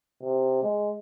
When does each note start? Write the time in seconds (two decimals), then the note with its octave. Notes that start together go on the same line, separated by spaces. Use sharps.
0.22 C3
0.63 G#3